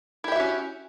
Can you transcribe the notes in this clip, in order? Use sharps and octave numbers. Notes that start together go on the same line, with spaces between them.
C#4 E4 F#4 G4 E5